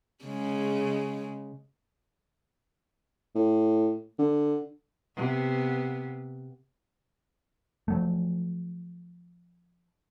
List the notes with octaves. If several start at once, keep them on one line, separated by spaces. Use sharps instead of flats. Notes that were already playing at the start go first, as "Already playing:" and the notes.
C#3 G#3
A2
D3
C3 B3
F3 F#3 A3